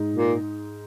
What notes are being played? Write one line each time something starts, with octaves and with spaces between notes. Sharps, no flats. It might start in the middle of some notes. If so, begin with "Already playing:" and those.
Already playing: G#2 G#3 D#4
A#2